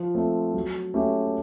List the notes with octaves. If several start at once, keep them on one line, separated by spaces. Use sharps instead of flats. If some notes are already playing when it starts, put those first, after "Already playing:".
Already playing: F3
A3 C4
F#3
A3 C#4 E4 G4